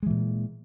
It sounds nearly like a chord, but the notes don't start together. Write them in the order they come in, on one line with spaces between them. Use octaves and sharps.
G#3 E3 A#2